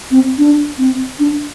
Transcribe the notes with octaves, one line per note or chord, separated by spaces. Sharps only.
C4
D4
C4
D4